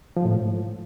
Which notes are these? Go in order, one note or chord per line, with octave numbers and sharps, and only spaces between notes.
F3
A2
G#2